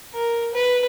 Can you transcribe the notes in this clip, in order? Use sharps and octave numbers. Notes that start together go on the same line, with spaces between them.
A#4
B4